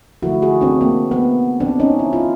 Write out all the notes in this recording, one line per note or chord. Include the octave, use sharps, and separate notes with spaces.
D3 F3 A3 E4 F#4
F#4 G#4
C4 D4
A#3 C4
B3
C4 D4
C#4 D#4
E4
F4